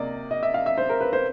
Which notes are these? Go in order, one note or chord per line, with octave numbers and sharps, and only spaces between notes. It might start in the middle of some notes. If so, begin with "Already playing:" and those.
Already playing: C3 A#3 D5 D#5
D#5
E5
F5
E5
C5
A#4
B4
C5